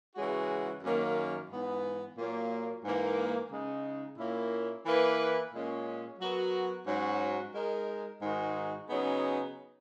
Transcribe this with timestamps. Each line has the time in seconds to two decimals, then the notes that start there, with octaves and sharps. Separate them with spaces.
0.16 C#3 E3 G#3 C#4 F#4
0.83 F#2 D#3 A#3 C#4
1.50 G#2 E3 B3
2.18 A#2 F#3 A#3
2.84 G#2 E3 A#3
3.51 C#3 G#3 D#4
4.18 A#2 A#3 C#4 E4
4.86 E3 A#3 E4 B4
5.54 A#2 G#3 C#4
6.20 F#3 B3 F#4 A#4
6.87 G#2 F#3 C#4 F#4
7.54 G#3 D#4 A#4
8.22 G#2 D#3 G#3 D#4 F#4
8.88 C#3 F#3 B3 D#4 G#4